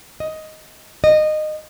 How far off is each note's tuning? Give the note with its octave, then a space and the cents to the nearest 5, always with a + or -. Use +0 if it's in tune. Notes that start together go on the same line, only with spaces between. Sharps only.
D#5 +10
D#5 -20